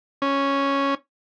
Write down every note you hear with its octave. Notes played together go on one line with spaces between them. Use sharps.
C#4